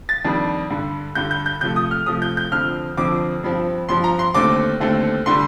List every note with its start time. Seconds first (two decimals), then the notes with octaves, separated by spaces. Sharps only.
0.09 A6
0.24 F2 D#3 G3 D4
0.70 G2 D3 G3
1.15 G2 D3 G3 G6
1.31 G6
1.46 G6
1.61 C3 F3 A3 G6
1.76 D#6
1.91 F6
2.06 C3 F3 A3 D#6
2.22 G6
2.37 G6
2.52 F2 D3 F3 C4 F6
2.97 F2 D3 F3 C4 D6
3.43 G2 F3 C4
3.89 G2 F3 C4 C6
4.04 A#5
4.19 C6
4.34 D#2 D3 A3 C4 D6
4.80 D#2 D3 A3 C4
5.26 D3 G3 C6